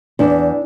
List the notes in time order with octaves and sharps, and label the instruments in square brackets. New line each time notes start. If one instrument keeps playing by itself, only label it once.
[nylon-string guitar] E2 D4